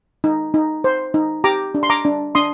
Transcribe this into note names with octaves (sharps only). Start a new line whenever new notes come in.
D#4
D#4
C5
D#4
G4 A#5 D6
D4
C6
A#5 D6
D4
D4 C6 D#6